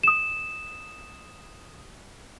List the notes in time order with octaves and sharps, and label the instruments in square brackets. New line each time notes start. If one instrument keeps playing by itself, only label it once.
[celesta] D#6 E7